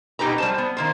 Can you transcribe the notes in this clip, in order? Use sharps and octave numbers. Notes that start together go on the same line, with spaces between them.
B2 D#4 G4 B4 A#5
G3 C5 A5
B3
D#3 A#3 C5